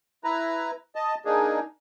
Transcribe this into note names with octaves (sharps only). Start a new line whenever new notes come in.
E4 B4 A#5
D#5 A5
A#3 D4 D#4 G#4